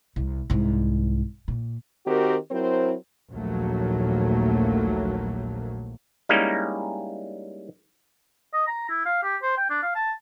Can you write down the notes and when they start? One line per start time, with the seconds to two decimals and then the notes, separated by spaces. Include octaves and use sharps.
0.16 C2
0.50 C2 G#2
1.48 A#2
2.06 D#3 C4 F#4 G4 A#4
2.51 F#3 C4 E4 A#4 C5
3.31 A#1 D#2 F#3 A3 A#3
6.29 G3 G#3 A#3 C#4 D#4 E4
8.54 D#5
8.68 A#5
8.89 E4
9.05 F5
9.23 G4
9.42 C5
9.57 G5
9.70 D4
9.83 F5
9.95 A5